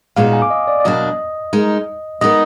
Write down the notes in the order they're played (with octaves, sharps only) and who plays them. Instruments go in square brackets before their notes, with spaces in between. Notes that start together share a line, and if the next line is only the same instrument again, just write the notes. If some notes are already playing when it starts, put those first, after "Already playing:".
[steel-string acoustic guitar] A#2 G#3 B3 D#4 F#4 [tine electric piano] F5
[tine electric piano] G#5
D6
D#5
D5
D5
[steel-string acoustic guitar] B2 F#3 A#3 D4 [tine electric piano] D#5
[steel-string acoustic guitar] G#3 D#4 A#4
[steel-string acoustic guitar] G#3 B3 D#4 A#4 [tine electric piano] D#5